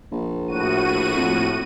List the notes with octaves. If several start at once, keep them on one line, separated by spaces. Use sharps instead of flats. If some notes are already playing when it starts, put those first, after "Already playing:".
A#1
A2 F#4 D#7
F2